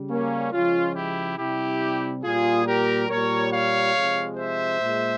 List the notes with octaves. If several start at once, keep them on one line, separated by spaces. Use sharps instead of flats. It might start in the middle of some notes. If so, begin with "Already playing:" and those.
Already playing: C#3 G3
A#3 C#4
C#3 F3 G#3 C#4 F4
E4 G4
C3 G3 E4 G4
A#2 G3 F4 G#4
G4 A#4
A#2 G3 A#4 C#5
C#5 F5
C3 F3 G#3
C5 E5
A#2 G#3